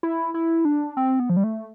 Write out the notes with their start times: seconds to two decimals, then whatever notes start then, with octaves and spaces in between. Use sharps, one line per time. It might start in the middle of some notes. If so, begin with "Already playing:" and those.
0.03 E4
0.34 E4
0.65 D4
0.97 C4
1.20 B3
1.30 F3
1.37 G3
1.44 A3